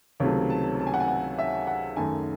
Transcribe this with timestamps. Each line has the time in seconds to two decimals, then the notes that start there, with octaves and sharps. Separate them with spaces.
0.20 C#2 C3 D#3 F#3 A3 C#5
0.50 A5
0.80 A5
0.87 G#5
0.94 F#5
1.00 G#5
1.08 F#5
1.39 E5
1.67 F#5
1.96 F#2 D#3 A3 G#5